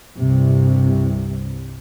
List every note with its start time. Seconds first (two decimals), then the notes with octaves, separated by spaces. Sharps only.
0.17 C2 G2 C3